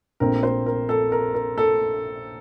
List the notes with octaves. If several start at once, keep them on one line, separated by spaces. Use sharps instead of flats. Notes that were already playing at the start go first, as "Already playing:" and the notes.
A#1 A#2 A3 C4 A#4
C5
A#4
A4
A#4
A#4
A4